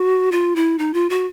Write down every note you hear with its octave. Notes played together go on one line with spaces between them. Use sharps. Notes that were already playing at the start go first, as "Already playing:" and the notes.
Already playing: F#4
F4
E4
D#4
F4
F#4